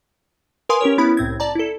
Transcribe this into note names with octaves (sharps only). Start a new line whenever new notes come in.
A#4 B4 F5 G#5 C6 D#6
C#4 G4 A#4 C#5
B3 C#4 E4 B5
C2 A2 C4 G#6
D5 A5 A#5
E4 A4